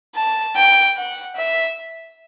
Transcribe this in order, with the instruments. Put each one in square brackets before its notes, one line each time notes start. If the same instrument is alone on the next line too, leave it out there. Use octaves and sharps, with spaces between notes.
[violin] A5
G5
F#5
E5